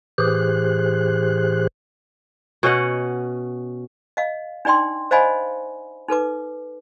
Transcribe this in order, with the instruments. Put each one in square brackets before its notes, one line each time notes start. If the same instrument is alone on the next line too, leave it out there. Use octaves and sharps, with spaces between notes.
[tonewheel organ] A2 E3 G4 G#4 C5 F#6
[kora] B2 C#4 D#5 F#5
[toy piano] D#5 F5
D4 D#4 D5 G5 C6
C5 D5 D#5 F5 G#5 B5
D#4 A4 B4 D6